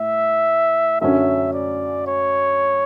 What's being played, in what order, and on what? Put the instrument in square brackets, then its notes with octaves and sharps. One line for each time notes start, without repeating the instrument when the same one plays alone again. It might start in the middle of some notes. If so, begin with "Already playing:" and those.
Already playing: [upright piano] A2 [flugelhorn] E5
[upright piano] F#2 D3 F#3 C#4 [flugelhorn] E5
[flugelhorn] D5
C#5